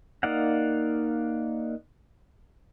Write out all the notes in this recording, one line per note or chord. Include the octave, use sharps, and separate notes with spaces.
A#3 D#4 D5 F5 F#5